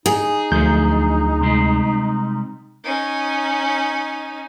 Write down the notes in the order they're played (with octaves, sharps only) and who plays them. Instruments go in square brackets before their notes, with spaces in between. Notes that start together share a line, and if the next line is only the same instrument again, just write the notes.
[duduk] D#4 [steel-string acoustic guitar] G#4
[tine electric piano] D2 G6 [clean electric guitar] F3 F#3 D4
[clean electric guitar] C3 G3 G#3
[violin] C#4 D#4